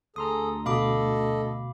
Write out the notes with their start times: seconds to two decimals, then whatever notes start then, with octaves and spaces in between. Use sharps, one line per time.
0.16 D2 G#4 A4 A#5 C6 D#6
0.66 B2 F#4 A4 D#5 F5 B5 D6